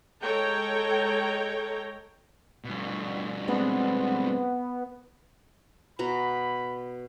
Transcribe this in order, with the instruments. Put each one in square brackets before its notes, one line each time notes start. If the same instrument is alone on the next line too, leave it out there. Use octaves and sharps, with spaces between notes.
[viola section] G#3 A4 C#5 G5 A#5
[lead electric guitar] G2 B2
[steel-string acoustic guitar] G#3 C4 D4 [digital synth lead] B3
[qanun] B2 F#4 A#5 [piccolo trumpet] B5